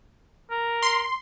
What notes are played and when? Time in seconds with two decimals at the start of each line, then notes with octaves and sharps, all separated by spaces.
0.51 A#4
0.83 C6